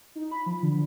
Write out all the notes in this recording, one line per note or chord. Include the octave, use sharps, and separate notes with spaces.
D#4
B5
F3
D3